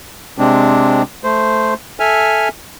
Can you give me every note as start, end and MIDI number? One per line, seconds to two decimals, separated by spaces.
0.38 1.02 48
0.38 1.02 56
0.38 1.02 60
0.38 1.02 62
1.24 1.74 57
1.24 1.74 72
2.00 2.48 69
2.00 2.48 76
2.00 2.48 80
2.00 2.48 89